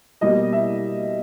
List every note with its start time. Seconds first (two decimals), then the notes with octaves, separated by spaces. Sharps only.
0.21 B2 G3 A#3 D#5
0.53 E5